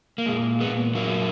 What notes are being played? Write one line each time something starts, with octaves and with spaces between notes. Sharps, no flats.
A#3
A#2 G#3
G#3 B3
A#2 F#3 A#3